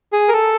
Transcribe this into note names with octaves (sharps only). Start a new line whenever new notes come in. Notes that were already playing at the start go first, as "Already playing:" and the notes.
G#4
A#4
A4